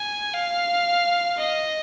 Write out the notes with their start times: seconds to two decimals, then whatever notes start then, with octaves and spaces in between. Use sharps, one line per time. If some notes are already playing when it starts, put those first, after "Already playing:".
Already playing: G#5
0.33 F5
1.38 D#5